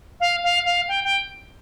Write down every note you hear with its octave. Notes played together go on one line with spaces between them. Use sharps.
F5
F5
F5
G5
G5